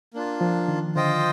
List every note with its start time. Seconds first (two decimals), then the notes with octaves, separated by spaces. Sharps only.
0.14 A#3 D4 F4
0.41 F3
0.68 D#3
0.95 D3 F4 C5 D#5 G5